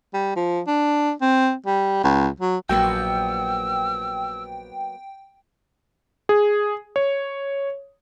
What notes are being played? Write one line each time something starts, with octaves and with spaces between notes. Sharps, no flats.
G3
F3
D4
C4
G3
C#2
F#3
A#1 F#3 A#3 B3 G5 E6
G#4
C#5